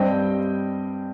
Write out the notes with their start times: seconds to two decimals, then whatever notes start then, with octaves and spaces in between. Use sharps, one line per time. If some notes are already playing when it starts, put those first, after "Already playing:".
Already playing: G2 G3 C4 D#5 G5